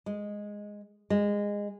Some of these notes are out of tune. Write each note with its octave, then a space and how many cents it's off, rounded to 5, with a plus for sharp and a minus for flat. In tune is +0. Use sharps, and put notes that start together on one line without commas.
G#3 -5
G#3 -20